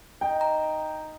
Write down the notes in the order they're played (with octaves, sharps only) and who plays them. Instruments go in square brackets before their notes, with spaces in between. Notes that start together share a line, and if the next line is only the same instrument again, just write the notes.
[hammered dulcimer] D#4 [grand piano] G5
[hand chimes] A#5